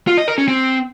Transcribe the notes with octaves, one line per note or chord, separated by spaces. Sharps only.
F4
D#5
A#4
C#4
C4